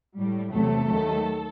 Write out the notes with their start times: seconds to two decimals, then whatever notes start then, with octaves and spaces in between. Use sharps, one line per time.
0.18 A2 G3
0.52 E2 C3 F#3 A3 A4
0.89 D#2 D#3 F#3 A3